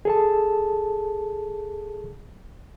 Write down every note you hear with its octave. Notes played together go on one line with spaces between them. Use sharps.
G#4 A4 A5